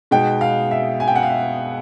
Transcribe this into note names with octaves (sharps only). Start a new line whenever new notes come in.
B2 G#3 B3 D#4 G5
F5
E5
G#5
G5
F#5
F5
E5